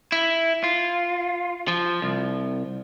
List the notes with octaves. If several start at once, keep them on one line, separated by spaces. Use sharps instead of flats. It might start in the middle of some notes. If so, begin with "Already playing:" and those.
E4
F4
F3
C2